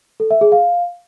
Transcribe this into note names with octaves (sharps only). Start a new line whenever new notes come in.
A4
E5
G#4
F5